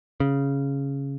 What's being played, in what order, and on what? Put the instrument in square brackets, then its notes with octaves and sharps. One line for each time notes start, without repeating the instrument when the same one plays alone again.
[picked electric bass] C#3